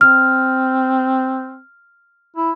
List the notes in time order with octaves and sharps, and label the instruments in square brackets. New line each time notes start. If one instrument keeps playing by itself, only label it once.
[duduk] C4 [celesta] F6
[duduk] E4